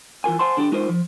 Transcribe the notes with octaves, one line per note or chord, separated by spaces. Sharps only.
E3 F4 A#4 G#5
C5 F#5 G#5 A5 C6
D3 D4 G4
G#3 D#4 F4 A#4 C5
F3